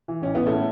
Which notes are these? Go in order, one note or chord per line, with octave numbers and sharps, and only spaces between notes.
E3
A1 C#4
A1 B3
A3 C#4
A2